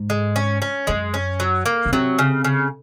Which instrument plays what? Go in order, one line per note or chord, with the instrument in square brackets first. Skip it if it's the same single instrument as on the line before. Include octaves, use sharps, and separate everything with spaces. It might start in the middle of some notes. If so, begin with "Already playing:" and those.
Already playing: [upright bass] G#2
[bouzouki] G#3
C#4
C#4
[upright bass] F#2 [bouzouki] G#3
[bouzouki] C#4
F#3
A#3
[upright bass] C#3
[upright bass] C3 [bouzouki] F#3
[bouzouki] C#3
C#3